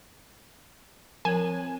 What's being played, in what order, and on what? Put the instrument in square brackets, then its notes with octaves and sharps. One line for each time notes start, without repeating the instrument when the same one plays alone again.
[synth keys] F3 C4 [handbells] A#4 C#5 [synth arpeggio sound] G#5